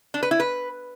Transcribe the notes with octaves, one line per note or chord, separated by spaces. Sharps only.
D4
B4
E4
B4